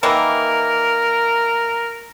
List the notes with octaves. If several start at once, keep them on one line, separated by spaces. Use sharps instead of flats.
D#3 E3 A#3 A#4